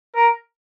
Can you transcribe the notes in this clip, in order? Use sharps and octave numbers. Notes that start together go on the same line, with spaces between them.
A#4